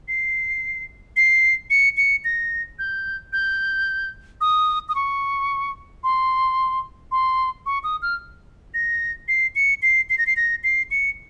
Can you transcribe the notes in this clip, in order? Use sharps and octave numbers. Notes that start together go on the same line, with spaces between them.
C7
C7
C#7
C#7
A#6
G6
G6
D#6
D#6
C#6
C6
C6
C#6
D#6
F6
A#6
C7
C#7
C7
C7
A#6
C7
A#6
C7
C#7